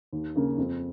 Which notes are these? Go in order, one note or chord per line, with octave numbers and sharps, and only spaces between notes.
D#2
C#3 A#3
F2